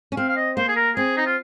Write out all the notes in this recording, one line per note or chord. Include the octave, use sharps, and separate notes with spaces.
C#4
C4 F5
F5
D#5
A#3 C5
G#4
A#4
C4 G#4
D#4
F4